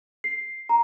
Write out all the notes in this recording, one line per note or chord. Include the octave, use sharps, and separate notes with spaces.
C7
A#5